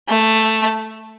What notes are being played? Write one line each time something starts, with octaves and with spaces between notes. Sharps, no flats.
A3